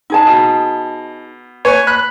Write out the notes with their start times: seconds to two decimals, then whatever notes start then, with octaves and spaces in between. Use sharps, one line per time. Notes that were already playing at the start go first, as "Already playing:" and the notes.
0.10 D#4 G#4 A5
0.27 B2
1.65 B4 C#5 G#5 C#6
1.87 B5 F#6